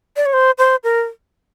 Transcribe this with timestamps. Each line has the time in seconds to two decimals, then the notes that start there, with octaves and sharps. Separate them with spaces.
0.16 D5
0.26 C#5
0.33 C5
0.58 C5
0.84 A#4